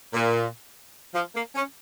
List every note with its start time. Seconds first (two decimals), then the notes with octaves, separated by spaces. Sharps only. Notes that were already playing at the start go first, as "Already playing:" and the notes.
0.13 A#2
1.14 F3
1.35 A#3
1.55 C#4